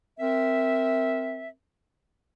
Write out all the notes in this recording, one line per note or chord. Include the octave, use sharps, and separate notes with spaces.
C4 A#4 E5